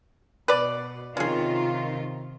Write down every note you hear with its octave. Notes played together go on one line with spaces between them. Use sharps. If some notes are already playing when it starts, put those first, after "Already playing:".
B2 B4 D5
C3 D#3 C#4 F4 G#4